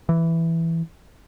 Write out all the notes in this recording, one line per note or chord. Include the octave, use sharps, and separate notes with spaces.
E3